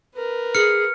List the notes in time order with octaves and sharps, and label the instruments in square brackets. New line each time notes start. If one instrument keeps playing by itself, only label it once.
[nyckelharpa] A#4 B4
[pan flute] G#4 [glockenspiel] F6 C#7